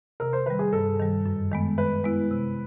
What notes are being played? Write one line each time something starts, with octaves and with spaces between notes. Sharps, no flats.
C3 A#4
C5
D#3 G3 B4
G#4
G2 A4
D#3 G3
F#2
D#3 G#3 B3
D#3 B4
G#3 B3 E4
C3